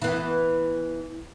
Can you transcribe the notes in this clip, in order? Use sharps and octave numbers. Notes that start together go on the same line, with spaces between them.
E3 B3